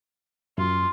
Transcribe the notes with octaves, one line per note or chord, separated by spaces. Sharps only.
F#2 F4